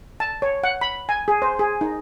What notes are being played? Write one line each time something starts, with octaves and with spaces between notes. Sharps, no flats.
A5
C#5
F#5
B5
G#5
G#4
C5
G#4
D#4